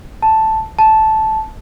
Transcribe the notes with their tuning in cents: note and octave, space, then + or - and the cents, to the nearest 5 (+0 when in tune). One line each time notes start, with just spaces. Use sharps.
A5 +0
A5 -10